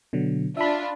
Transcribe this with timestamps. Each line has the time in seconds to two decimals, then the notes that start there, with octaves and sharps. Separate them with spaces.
0.13 B2 D3 F#3
0.57 D4 F4 E5 B5